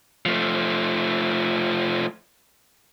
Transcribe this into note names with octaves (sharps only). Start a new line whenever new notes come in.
F3 A3